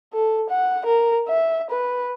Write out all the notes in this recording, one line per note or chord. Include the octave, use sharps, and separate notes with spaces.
A4
F#5
A#4
E5
B4